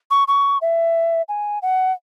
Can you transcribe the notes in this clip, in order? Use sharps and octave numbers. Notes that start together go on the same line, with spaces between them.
C#6
C#6
E5
G#5
F#5